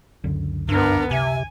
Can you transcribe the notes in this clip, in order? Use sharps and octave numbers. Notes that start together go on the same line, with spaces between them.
C#2 F#2 D3
G2 B3 D4 A#4
C3 E5 G#5